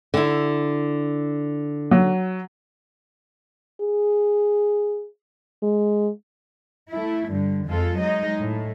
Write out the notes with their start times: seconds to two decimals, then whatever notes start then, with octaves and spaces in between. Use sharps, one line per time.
0.14 D3 E4
1.91 F#3
3.81 G#4
5.62 G#3
6.89 A3 E4
7.31 G2 D3
7.66 F2 G#3 F4 A4
7.98 F#3 G#3 D#4 D#5
8.40 A2